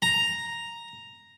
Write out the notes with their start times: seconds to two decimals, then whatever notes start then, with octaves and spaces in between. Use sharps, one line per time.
0.02 A#5